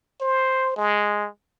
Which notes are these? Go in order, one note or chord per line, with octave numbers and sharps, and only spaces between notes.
C5
G#3